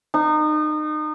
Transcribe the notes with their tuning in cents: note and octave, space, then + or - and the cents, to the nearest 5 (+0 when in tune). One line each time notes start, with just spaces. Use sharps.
D#4 -30